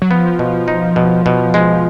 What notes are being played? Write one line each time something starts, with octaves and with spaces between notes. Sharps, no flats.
F#3
F3 B3
B2
D#4
B2
B2
G#3